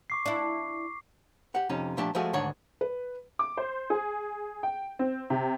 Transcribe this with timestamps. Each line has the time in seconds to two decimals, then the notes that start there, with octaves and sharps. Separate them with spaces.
0.10 C#6 D6 C7
0.26 D4 E4
1.55 G4 F#5
1.69 F2 C3 C#4 D#4
1.97 A#2 F3 A3 D4 G4 A5
2.15 F3 G#3 A3 F#4 G#4
2.33 D2 G#2 D#3 D4 C#5 F#5
2.81 B4
3.39 D6
3.57 C5
3.90 G#4
4.63 G5
4.99 C4
5.30 C3